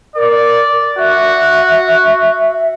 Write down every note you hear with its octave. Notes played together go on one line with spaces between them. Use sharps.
A#4 D5
F#4 E5